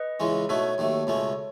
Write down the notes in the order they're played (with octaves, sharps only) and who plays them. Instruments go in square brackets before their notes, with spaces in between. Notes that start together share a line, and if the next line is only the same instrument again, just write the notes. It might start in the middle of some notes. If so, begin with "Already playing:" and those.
Already playing: [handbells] B4 D#5
[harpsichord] C#2 C#3 E3 G#3 C#4
[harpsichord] B2 A3 D#4 F#4 [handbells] A4 C#5
[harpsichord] D#2 D#3 F#3 A3
C#2 B2 A3 C#4